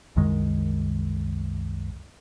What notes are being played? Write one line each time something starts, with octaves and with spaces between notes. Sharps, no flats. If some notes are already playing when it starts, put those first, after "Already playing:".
C2 F#2 D#3 G#3